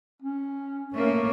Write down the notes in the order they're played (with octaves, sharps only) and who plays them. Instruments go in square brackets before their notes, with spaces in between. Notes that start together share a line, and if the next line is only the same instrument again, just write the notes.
[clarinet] C#4
[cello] A3 A#3 [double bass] C#4 [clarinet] A#4